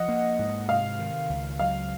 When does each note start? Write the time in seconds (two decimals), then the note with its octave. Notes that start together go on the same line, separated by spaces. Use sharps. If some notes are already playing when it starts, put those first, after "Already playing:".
Already playing: F3 D#5 F#5
0.09 A#3
0.39 G#2
0.69 C3 F5
0.99 D#3
1.30 C#2
1.59 F#3 F5